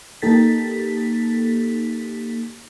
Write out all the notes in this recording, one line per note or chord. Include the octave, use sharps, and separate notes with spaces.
A#3 D#4 G4 A4 A6 B6